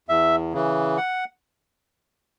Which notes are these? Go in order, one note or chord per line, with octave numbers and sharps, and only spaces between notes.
E2 E5
C#3 E3
F#5